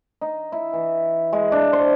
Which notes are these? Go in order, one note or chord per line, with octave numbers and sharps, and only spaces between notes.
D#4
E4
E3
G#3
D4
C5